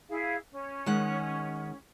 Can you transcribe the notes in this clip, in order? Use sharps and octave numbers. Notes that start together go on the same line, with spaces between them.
E4 G#4 F5
C#4
D#3 G#3 F#5